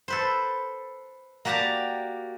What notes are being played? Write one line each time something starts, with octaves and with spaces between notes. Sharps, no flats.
A4 B4 C5
A#3 F#4 G4 D5 A5 A#5